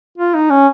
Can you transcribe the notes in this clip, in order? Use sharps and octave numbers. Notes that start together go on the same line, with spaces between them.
F4
D#4
C#4